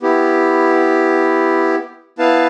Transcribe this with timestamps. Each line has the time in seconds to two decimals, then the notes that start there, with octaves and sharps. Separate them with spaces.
0.02 B3 E4 G4
2.18 B3 E4 B4 F5 A5